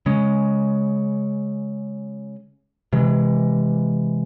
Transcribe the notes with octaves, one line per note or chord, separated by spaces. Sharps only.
C#3 G#3 C#4
C3 E3 G#3